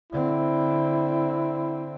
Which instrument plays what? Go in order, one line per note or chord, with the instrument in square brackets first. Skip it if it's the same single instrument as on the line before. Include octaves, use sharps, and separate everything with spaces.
[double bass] D3 C4 [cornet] E4